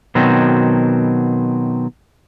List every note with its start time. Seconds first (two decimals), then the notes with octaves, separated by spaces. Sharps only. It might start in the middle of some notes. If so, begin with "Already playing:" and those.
0.15 B2 D#3 F#3 C4